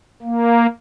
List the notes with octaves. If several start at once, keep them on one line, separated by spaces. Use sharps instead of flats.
A#3